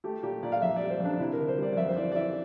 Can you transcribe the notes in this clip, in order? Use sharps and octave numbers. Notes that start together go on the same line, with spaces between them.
A3 G4
A#2 G4
A#2 D5
F5
F2 E5
G3 D5
C5
F2
D4
C3 E4
D2 A#4
C5
G3 D5
D5
F2 E5
C5
E3 D5
D5
E3 E5